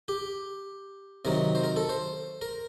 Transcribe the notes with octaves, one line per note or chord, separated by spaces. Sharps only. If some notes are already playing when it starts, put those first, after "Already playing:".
G4
C3 D#3 F#3 A#4
C5
A#4
A4
C5
A#4